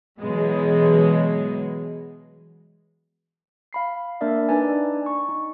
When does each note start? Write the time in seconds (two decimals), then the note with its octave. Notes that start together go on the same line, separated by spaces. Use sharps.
0.19 B2 E3 F#3 G#3
3.73 F5 B5 C7
4.21 A#3 D4 A#4 D5 E5
4.49 D4 D#4 B4 D5 G#5
5.06 C#6
5.29 D#4